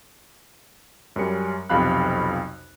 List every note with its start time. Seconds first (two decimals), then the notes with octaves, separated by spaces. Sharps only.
1.16 F#2 G3 C#4 C#7
1.69 B1 F2 C3 F5 B5 F#6